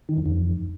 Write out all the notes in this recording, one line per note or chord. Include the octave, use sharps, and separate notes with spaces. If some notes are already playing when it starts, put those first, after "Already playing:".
D#3
E2
F2